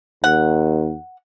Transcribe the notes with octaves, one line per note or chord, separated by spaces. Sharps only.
D#2 F#5